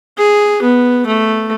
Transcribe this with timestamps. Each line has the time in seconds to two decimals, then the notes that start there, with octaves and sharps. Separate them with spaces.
0.18 G#4
0.62 B3
1.07 A3